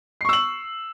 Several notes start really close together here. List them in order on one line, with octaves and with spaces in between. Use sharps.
C7 C#6 E6 F#7